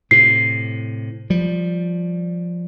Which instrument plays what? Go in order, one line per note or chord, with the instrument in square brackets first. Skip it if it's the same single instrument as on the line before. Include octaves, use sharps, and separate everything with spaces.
[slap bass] A2 C3 [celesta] C7
[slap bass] F3 G3